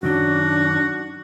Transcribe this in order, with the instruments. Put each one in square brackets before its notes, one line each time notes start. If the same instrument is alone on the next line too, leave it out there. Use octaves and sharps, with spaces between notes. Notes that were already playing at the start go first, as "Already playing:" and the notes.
[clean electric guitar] F#2 D#3 F#3 [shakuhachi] D4 [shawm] F#4